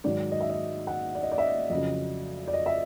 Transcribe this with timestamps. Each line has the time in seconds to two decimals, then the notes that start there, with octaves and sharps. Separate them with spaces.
0.04 G#2 D#3 F#3 D5
0.32 D#5
0.41 E5
0.49 D#5
0.87 F#5
1.15 D5
1.23 D#5
1.32 D5
1.38 E5
1.42 D#5
1.70 F2 C#3 F#3 D#5
2.48 D5
2.53 D#5
2.66 E5